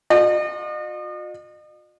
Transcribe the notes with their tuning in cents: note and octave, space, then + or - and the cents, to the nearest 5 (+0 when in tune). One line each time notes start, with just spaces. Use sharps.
F4 +45 D#5 -40